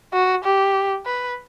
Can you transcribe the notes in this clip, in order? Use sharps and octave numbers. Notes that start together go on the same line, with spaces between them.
F#4
G4
B4